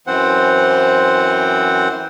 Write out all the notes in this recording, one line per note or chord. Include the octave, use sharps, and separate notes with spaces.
F#2 E3 C4 C5 F#5